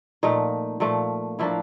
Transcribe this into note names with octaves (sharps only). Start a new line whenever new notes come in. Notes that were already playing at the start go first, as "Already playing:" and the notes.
A#2 F3 A3 D#4
A#2 F3 A3
A2 F3 A#3 D4 E4